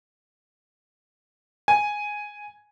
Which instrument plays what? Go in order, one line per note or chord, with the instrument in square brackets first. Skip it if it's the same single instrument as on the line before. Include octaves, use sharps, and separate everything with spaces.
[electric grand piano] G#5